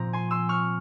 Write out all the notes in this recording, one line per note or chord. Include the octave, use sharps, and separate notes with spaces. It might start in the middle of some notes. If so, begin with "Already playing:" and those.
Already playing: A#2 F3 C4 A#5
G#5 C6
C6 E6
C#6 F6